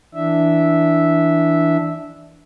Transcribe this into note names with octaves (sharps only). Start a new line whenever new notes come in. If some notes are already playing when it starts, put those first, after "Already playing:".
E3 D4 E5